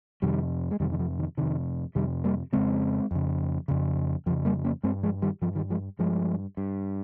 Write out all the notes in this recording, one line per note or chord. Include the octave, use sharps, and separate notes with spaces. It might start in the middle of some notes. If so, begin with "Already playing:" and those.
F2 C3 D#3 G3
G#3
F2 C3 D#3 G3
D#3
F3
D#3
F2 C3 D#3
F2 C3 D#3 G3
G3 A#3
F2 C#3 G#3 C4
F2 C#3
F2 C#3
F2 C#3 F3
G3 A#3
A#3 C#4
G2 G#3 C4
F3 G#3
D#3 G3
G2 F3
D#3 G3
F3 G#3
G2 F3 G#3
G2